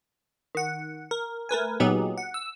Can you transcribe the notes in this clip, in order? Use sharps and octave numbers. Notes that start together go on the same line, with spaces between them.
D#3 F#5
A#4
A3 A#4 B4 G#5
A#2 F#3 B3 D#4 G4 G#4
F#5
E6